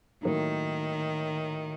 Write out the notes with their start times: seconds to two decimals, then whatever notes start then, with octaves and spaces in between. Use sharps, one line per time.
0.23 A2 D#3 F#3 A#3 D#4